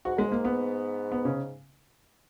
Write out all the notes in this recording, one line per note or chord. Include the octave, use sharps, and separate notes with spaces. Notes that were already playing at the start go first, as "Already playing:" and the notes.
G#2 F#4
F#2 G#3
G#2 A#3
B3
B3
C#3